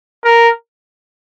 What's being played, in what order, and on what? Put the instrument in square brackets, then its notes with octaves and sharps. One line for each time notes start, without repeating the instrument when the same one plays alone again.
[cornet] A#4